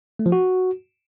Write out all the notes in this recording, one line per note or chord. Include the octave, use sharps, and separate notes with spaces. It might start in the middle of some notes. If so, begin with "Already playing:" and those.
A3
F3
F#4